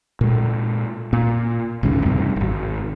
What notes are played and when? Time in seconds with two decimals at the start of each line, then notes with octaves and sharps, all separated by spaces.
0.21 A#2 G#3
1.13 A#2
1.83 A1 D2 G#2 C#3
2.05 E2 G2 C3 G3
2.36 D#1 G#1